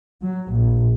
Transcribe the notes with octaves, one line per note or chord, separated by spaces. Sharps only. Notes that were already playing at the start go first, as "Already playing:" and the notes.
F#3
A#1